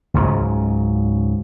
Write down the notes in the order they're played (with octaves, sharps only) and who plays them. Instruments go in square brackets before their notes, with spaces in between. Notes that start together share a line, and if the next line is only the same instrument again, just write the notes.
[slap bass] C#2 G#2 C#3 F#3